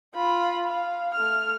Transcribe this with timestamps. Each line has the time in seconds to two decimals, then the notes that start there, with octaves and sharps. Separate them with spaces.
0.15 F4 B5
0.67 F5
1.15 A3 F6